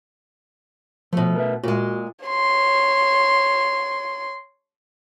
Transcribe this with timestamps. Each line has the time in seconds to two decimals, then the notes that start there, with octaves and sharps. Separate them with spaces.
1.13 B2 F3 A3
1.35 A#4 B4 E5
1.63 A#2 G#3 F#4
2.26 C#5 C6